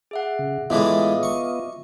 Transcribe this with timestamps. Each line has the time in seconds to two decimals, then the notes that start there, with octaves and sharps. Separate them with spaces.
0.11 G#4 E5 F#5
0.39 C#3
0.70 A2 E3 G#3 B3 F4 D#5 E5 D6
1.23 C#6